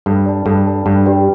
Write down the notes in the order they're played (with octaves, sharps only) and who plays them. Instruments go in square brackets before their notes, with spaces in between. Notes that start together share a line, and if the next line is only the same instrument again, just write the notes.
[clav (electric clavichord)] G2 [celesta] A4
[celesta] D5 A5
[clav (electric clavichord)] G2 [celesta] A4
[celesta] D5 A5
[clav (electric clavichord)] G2 [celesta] D4
[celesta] G4 B4 D5 G5